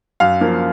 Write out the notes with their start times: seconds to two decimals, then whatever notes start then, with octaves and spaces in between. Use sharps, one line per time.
0.20 F#2 F5
0.41 F3 A#3